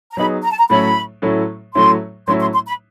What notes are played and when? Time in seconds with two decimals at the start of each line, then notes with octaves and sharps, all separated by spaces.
0.12 A#5
0.17 F#3 B3 D#4 G#4 B5
0.43 A#5
0.51 A5
0.59 A#5
0.69 A2 F#3 A3 C#4 E4 B5
1.22 A2 F#3 A3 C#4 E4
1.75 A2 F#3 A3 C#4 E4 C6
2.27 A2 F#3 A3 C#4 E4 C6
2.40 C6
2.54 C6
2.67 B5